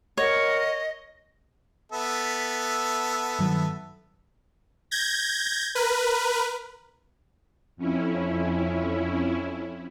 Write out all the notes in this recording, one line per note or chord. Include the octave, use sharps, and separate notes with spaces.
A#4 C#5 D#5 F#5
B3 A4 E5
G2 D#3 F#3
G6 G#6 A#6
A#4 B4
F2 C#4 E4